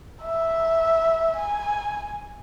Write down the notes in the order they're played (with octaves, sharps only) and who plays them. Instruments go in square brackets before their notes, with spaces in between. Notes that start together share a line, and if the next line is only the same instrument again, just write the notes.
[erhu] E5
G#5